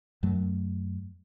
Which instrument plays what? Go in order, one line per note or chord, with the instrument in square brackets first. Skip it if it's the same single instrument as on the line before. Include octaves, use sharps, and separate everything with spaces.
[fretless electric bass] F#2 F#3 A3